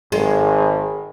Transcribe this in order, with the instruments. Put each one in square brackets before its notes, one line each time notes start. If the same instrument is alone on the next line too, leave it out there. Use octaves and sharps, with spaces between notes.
[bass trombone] G#1 [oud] G#3